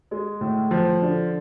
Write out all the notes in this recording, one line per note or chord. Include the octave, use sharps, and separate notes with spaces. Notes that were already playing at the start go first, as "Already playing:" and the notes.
G#3
A2
F3
D3